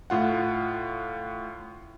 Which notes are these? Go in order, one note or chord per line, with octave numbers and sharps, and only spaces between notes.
A2 F4 F#5